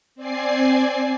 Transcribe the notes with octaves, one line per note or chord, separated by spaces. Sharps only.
C4 D5 G#5 C7